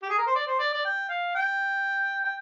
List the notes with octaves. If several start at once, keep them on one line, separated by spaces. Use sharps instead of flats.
G4
G#4
A#4
C5
D5
C5
D5
D5
G5
F5
G5
G5